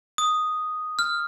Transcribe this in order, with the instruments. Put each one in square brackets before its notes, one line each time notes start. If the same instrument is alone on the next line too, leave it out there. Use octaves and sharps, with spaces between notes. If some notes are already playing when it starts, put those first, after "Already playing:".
[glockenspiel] D#6
F6